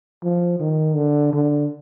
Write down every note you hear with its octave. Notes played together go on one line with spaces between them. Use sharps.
F3
D#3
D3
D3